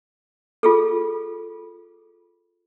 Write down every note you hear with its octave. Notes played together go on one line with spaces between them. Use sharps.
F4 G#4 A4